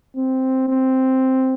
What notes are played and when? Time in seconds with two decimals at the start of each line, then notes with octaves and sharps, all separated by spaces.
0.16 C4
0.69 C4